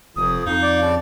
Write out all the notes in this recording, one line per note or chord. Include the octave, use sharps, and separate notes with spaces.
F1 F2 D#6
F2 D#4 F5
D5
C#3 A5